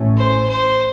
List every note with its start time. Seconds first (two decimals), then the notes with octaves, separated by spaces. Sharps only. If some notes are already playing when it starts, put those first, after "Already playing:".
Already playing: A1 A2 A3 C#4
0.17 C5
0.49 C5